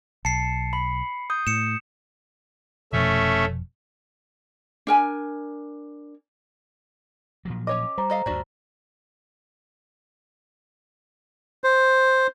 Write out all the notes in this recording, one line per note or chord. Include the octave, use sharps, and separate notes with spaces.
B1 A5 C7 C#7
B5
D#6 G6
A2 C#7 E7
F1 B2 F3 A3 C#4 E5
D4 A#4 G#5
A#2 F3 F#3
C#4 C#5 D#5 D6
G3 C5 A#5
A4 D#5 F5
D2 G2 D4 F#4
C5